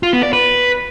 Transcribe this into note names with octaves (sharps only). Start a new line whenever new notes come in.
F4
B3
D5
B4